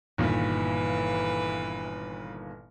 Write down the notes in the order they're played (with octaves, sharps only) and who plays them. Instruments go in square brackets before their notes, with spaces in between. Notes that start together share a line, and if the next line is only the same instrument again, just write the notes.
[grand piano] G1 A#2 D#3 [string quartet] E3 B4